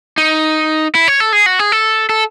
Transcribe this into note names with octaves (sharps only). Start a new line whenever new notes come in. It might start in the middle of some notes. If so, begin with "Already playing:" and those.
D#4
E4
C#5
A4
G#4
F#4
G#4
A4
A4